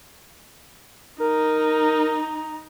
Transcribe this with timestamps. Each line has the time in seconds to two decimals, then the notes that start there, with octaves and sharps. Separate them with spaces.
1.20 D#4 A#4 A#5